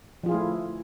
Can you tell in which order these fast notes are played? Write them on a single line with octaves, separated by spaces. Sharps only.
F3 F4 G#4 E4 A3